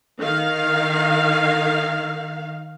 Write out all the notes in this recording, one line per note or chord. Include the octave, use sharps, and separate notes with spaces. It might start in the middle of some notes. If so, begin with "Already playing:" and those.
D#3 F5